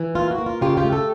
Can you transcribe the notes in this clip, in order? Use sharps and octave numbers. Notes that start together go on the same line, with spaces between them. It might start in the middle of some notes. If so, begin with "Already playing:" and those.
Already playing: E3
A#3 F4
F#4
A#3
F4
C#3 F4 G4
F4 G4
A3
G4 A4